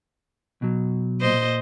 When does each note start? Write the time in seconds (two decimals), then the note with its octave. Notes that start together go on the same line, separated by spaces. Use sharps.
0.62 B2 F#3
1.21 A#2 C5 D#5